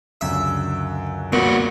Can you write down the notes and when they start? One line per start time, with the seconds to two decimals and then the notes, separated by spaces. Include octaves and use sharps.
0.21 C#2 F#2 D3 E5
1.33 G2 A#2 B3 F#4